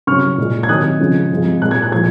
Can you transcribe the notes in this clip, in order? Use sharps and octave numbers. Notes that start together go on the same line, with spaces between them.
C#3 F#3 C#6 F6
A#2 G#3
G#6
C3 D#3 F#3 D#6 F#6
C#3 F3 G#3
C3 F3 G#3
A#2 G#3 F#6
G#6
F#6
A#2 F3 G#3 G#6